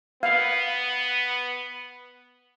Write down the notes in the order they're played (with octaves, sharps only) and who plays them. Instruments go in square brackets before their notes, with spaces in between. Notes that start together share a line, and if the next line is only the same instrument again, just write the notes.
[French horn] B3 [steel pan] F5